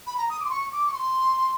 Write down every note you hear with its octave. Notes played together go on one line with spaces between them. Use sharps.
B5
A#5
D#6
D6
C6
C#6
D6
C#6
C6